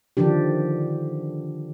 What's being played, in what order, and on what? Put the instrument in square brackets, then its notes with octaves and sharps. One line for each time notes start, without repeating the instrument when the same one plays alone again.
[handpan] D3 D#3 F3 D4 G4